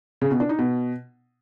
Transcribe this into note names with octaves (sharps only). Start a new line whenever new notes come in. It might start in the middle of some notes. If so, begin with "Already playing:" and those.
C#3
B2
D4
D#4
B2